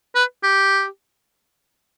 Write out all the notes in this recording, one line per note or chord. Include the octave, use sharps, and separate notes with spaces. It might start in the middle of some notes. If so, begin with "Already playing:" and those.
B4
G4